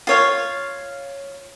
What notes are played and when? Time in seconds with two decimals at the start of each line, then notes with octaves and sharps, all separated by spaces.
0.07 F4 C#5 F5